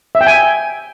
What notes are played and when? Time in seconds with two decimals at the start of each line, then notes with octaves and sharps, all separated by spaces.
0.15 E5
0.21 G5
0.27 G#5